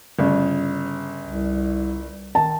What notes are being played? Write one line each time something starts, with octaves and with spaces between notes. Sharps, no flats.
G1 C#3
C2
D#3 A5